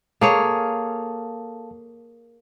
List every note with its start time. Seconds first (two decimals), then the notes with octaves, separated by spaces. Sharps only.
0.21 A#3 G#4 A4 C#5 F5 A5